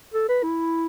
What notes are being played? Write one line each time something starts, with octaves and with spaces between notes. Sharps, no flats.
A4
B4
E4